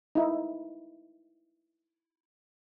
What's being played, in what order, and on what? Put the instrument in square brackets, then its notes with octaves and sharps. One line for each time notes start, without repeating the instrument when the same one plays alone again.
[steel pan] D#4 E4